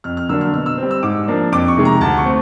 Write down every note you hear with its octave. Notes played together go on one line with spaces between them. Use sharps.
F2 F6
F6
D3 F#3 A#3 D4 E6
F6
B2 F6
E6
G3 C4
E6
G#2 D6
F3 A#3 D4
F2 D6
C#6
C3 D#3 G#3
A#5
D2 A5
C#6
A3 C4